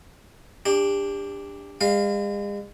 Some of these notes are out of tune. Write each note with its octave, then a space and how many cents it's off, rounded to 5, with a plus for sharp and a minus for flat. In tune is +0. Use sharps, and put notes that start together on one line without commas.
D4 -5 G4 +30
G#3 -40 F5 +0